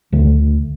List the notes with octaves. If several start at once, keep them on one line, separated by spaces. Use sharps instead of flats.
D2 D3 A3